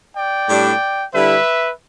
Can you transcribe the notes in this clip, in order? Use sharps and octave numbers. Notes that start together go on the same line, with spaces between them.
D5 G5
A2 G3 D4
D3 G3 E4 B4 E5